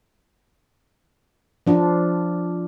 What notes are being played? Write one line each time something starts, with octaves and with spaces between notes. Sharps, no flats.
F3 D4 F4